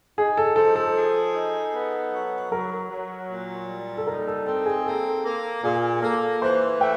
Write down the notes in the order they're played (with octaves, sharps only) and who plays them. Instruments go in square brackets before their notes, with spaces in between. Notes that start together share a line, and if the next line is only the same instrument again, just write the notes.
[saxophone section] D#4 [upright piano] G#4
[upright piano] A4
[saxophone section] F3 [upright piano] A4
[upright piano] A4
[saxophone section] G#4
D#4
B3
F#3
[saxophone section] F#3 [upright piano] A#4
[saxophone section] F#3
A#2
G3
[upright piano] A4
[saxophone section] D#4 [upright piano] A#4
[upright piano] A4
[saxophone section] C4 [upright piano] A4
[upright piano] G#4
[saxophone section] A#3 [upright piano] A4
[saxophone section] A#3
[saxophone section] A#2 [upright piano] G#4
[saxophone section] A#3 [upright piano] A4
[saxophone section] E3 [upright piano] C5
[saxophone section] A3 [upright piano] G5